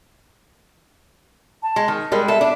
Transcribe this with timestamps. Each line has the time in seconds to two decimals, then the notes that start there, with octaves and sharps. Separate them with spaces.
1.63 A5
1.76 G#3
1.88 D#3
2.12 G3 G#3 A#4
2.28 A4 E5
2.41 D4